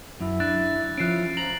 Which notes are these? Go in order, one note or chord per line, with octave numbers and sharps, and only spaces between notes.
F#2 E4
D4 F#6 A6
F3 C#4 E4 F#6 C7 D7
F3 A#5 F#7